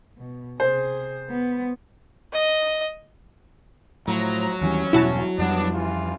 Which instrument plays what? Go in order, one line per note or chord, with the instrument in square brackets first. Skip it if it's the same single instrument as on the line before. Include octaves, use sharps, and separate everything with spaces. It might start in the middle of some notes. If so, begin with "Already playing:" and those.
[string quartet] B2
[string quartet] C3 G#4 [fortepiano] C5
[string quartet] B3
[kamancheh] D#5
[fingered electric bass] A2 [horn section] F3 A#5 [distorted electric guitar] F#3
[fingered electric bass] D#2 E3 G3 [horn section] C#4
[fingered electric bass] E1 G2 B2 [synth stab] E4 F#4 A5
[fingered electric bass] F2 G3 [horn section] B3 D4
[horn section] E3 F4